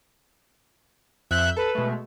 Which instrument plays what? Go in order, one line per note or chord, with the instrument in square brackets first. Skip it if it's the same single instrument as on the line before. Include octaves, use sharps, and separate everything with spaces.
[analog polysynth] F2 E5 G6 [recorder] F#6
[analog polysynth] A4 [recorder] B4
[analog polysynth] B2 G#3 A3